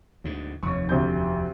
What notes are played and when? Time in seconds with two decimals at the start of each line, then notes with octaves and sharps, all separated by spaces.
0.24 D2 G#2
0.63 F1 D#2 C#5 C#6
0.89 D2 C3 G6